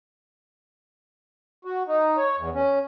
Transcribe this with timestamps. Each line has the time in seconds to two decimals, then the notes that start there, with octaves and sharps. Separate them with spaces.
1.65 F#4
1.87 D#4
2.17 C#5
2.38 E2
2.54 C#4